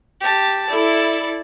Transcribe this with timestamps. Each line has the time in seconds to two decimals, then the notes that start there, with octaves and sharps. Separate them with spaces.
0.21 G4 A5
0.70 E4 A4 D5